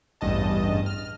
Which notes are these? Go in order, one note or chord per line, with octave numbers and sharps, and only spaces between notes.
A1 E2 G2 D#5 A5
F6